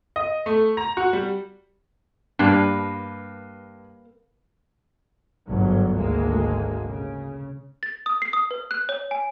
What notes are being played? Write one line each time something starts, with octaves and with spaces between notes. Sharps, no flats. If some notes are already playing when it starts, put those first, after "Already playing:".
D#5
A3
A#5
F#4
G3
G2 A#3 D4 B4
G1 G#2 F#3
G#1 D2 G#3 A#3
C#3
A6
D#6
C7
D#6
B4
F#6
C#5
G#5